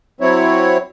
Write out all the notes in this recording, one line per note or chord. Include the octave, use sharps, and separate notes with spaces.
F#3 C4 E4 C#5